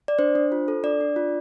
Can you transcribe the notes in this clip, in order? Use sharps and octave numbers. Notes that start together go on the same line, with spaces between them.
D5
D4 C5
D4
F4
A4
D4 D5
D4
F4